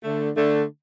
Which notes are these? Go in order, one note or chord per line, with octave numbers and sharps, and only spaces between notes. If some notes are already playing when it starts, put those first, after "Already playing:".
D3 A3
D3 A3